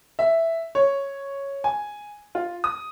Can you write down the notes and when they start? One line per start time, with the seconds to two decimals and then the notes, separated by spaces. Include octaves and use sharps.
0.19 E5
0.75 C#5
1.64 G#5
2.35 F4
2.64 D#6